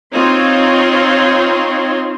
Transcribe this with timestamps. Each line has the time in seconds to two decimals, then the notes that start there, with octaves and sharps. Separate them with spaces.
0.13 C4 D#4 F4 C#5 C6